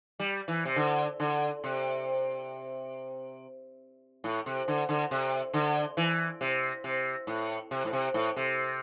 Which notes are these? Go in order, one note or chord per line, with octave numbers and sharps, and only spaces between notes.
G3
E3
C3
D3
D3
C3
A2
C3
D3
D3
C3
D3
E3
C3
C3
A2
C3
A2
C3
A2
C3